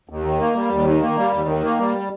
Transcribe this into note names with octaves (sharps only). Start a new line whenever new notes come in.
D#2
D#3
A#3
G3
D#2
D#3
A#3
G3
D#2
D#3
A#3
G3